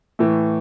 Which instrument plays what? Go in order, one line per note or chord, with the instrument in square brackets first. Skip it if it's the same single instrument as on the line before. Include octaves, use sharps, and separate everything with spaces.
[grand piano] A2 E3 A3